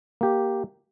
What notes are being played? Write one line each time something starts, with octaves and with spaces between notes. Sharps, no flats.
A#3 G4